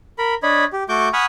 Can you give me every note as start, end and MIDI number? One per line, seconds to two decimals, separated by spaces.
0.18 0.34 70
0.18 0.34 83
0.43 0.65 62
0.43 0.65 73
0.43 0.65 75
0.43 0.65 83
0.73 0.83 67
0.89 1.09 57
0.89 1.09 66
0.89 1.09 85
0.89 1.09 86
0.89 1.09 91
1.13 1.26 78
1.13 1.26 80
1.13 1.26 83
1.13 1.26 85
1.13 1.26 87
1.13 1.26 89